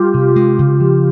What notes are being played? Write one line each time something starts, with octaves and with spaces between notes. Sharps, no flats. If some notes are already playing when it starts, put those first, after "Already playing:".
Already playing: G3 F4 G4
C3
G#3
C#3
F3